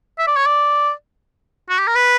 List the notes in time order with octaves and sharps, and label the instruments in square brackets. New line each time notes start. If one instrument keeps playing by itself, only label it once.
[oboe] E5
D5
C#5
D5
F#4
G4
A#4
B4